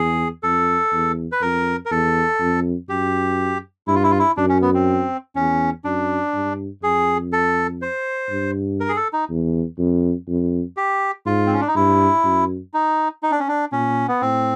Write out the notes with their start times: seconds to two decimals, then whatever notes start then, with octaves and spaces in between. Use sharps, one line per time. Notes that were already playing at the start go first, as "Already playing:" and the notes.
Already playing: E2 G#4
0.43 F2 A4
0.93 E2
1.32 B4
1.41 F2 A#4
1.86 A#4
1.90 E2 A4
2.40 F2
2.89 F#2 G4
3.87 G2 E4
3.95 F4
4.04 E4
4.11 F4
4.19 E4
4.37 F#2 D4
4.49 C#4
4.62 B3
4.74 C4
5.36 E2 C#4
5.84 F#2 D4
6.34 G2
6.83 F2 G#4
7.33 A4
7.82 C5
8.30 G2
8.80 A#4
8.89 G#4
8.96 A4
9.13 D#4
9.30 E2
9.79 F2
10.28 F2
10.77 G4
11.26 G#2 F4
11.47 C4
11.53 C#4
11.61 D4
11.68 D#4
11.76 G2 E4
12.24 F#2
12.74 D#4
13.23 D#4
13.31 D4
13.40 C#4
13.48 D4
13.72 A#2 C#4
14.08 B3
14.21 A2 C4